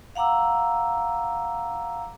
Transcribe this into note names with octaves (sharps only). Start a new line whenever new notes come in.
F5 F#5 A#5 D6 E6